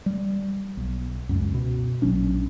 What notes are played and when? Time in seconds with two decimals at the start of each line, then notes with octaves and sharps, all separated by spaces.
0.06 G3
0.77 B1
1.29 C#2 F#2
1.54 B2
2.02 A#1 F#3 C#4 D4